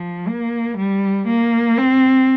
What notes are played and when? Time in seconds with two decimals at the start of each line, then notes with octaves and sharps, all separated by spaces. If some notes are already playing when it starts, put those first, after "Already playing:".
Already playing: F3
0.28 A#3
0.77 G3
1.27 A#3
1.77 C4